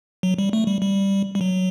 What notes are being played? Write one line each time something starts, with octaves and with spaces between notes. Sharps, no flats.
F#3
G3
A3
G3
G3
G3
F#3